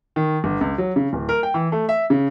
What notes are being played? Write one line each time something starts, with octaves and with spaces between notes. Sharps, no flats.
D#3
G1
C#2
F#3
C#3
D1
A#4
G5
E3
A3
E5
C#3